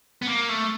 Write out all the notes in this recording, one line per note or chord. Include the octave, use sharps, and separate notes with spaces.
B3
A#3
A3